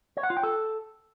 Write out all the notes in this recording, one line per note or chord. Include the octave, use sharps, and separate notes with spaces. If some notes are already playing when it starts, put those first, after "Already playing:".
C#5
F#5
F4
G5
A4